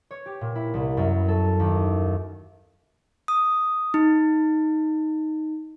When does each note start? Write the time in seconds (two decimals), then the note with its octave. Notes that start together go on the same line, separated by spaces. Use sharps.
0.11 C#5
0.26 G4
0.41 A#2
0.55 E4
0.74 C2
0.97 F#2
1.28 A4
1.60 D#2
3.28 D#6
3.94 D#4